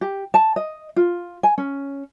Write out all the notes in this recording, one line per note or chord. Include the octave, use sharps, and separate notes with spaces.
G4
A5
D#5
F4
G#5
C#4